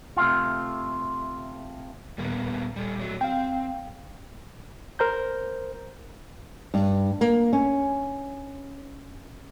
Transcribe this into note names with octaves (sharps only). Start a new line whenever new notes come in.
C3 A3 F4
D#2 A#2 G3 A#3 B3
G3 A4
F#3 A3
C4 F5 G5
A#4 C5 A#5 G6
G2
A#3
C#4